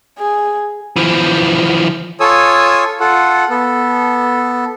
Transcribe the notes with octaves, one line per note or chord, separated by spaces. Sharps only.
G#4
E3 F3
F4 A4 C#5 G#5 D#6 E6
F4 A4 F#5
B3 A4